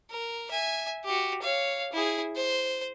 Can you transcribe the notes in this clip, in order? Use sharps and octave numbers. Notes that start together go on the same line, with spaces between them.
A#4
E5 G#5
F#4 G4
C#5 F5
E4 G#4
C5